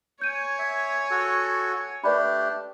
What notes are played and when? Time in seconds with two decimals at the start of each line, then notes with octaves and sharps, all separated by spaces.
0.21 C#5 G#5 G6 D#7
0.59 E5
1.11 F#4 A4
2.04 A3 D4 G4 B4 D5 B5